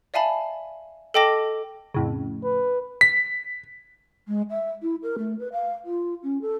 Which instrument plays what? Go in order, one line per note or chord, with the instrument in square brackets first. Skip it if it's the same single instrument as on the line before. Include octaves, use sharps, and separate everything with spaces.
[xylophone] D5 E5 F5 G#5 A5 B5
A4 D#5 G5 A5 D6 A#6
[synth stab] F2 A2 C#3
[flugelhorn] B4
[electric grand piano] B6
[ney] G#3
E5
E4
A#4
A3
B4
F5
F4
C#4
A4